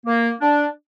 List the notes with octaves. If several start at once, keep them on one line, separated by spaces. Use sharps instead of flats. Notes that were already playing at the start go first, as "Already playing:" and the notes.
A#3
D4